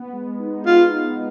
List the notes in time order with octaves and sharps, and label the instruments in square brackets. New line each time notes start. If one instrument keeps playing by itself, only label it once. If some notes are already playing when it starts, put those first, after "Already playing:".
Already playing: [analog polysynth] B3
G#3
D#4
[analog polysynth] G#3 [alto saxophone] F4